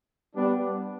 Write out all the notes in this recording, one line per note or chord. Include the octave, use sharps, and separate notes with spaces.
G3 B3 D4